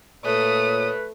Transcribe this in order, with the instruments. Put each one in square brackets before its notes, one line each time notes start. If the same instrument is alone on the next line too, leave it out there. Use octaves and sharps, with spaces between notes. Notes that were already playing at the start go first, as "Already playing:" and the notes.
[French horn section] A#2 C#5 [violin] A3 [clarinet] B4 [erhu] D#6